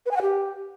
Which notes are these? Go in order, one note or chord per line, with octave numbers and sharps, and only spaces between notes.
B4
G#5
F#5
G4